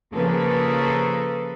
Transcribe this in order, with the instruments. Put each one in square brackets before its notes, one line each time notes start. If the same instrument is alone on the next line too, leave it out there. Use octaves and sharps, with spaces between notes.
[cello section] C#3 F3 A#3 G#4 A4 B4